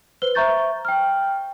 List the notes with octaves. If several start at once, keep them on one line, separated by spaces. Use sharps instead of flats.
B4 C5 G7
C5 E5 A#5 C#6 G6 A6
G5 F6